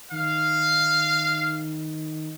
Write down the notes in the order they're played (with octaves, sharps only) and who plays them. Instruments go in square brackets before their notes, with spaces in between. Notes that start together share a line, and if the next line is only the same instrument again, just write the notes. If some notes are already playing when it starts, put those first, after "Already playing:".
[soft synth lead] D#3 [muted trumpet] F5